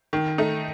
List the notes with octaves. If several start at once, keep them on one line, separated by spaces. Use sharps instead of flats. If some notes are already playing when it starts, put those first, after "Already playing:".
D#3
A3 D#4